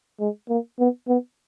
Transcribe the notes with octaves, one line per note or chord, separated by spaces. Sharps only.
G#3
A#3
B3
B3